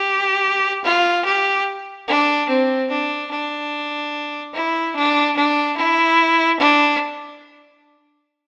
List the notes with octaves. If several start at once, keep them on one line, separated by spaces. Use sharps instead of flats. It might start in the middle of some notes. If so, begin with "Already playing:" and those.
Already playing: G4
F4
G4
D4
C4
D4
D4
E4
D4
D4
E4
D4